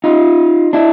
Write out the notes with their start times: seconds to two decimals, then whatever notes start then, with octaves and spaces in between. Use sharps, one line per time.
0.04 D#4 F4
0.73 D4 E4